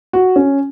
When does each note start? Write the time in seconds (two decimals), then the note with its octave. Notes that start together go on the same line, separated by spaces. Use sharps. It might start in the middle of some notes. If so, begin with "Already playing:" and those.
0.13 F#4
0.36 C#4